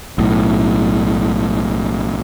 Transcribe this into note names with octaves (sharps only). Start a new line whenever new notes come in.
B1 A2